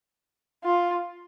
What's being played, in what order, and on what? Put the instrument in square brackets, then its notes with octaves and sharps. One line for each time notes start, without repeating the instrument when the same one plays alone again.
[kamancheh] F4